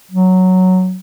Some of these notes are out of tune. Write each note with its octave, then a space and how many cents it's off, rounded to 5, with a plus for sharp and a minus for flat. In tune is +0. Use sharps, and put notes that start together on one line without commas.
F#3 +0